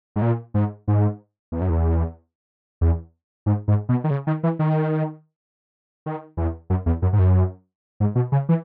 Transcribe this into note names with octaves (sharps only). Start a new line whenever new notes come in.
G#2
A#2
G#2
G#2
E2
F#2
E2
E2
G#2
G#2
B2
D#3
C#3
D#3
E3
D#3
D#3
E2
F#2
E2
F#2
G#2
F#2
G#2
B2
C#3
E3